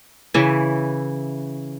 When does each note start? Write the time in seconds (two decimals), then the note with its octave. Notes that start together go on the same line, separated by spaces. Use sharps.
0.34 C#3 E3 E4